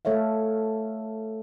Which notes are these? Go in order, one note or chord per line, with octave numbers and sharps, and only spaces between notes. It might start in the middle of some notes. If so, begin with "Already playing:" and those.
A3 A4 C#5 E5 F5